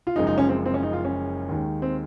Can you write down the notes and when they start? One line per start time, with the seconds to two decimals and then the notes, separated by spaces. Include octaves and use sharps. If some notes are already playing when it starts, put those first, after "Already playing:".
0.07 F4
0.16 F#1 F#2 F3 G#3 D#4
0.27 D#4
0.38 C#4
0.49 C4
0.66 C4
0.74 C#4
0.83 D#4
0.93 F4
1.05 C#4
1.49 D#2 D#3 G#3
1.82 C4